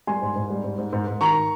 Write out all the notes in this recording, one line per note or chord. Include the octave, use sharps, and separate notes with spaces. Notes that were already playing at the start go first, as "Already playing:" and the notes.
G3 G#5 C6
G#2
G#2
G3
G#2
G#2
G#2
G#2
D#3 A#5 C#6